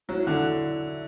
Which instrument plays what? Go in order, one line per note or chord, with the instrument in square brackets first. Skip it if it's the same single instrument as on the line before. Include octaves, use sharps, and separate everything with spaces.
[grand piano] F#3 [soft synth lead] E4
[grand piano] D3